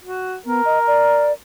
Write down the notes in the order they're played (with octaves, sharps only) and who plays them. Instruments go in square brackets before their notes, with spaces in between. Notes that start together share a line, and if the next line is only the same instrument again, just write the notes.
[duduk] F#4
[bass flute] B3 [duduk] A#4
[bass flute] D#5
D5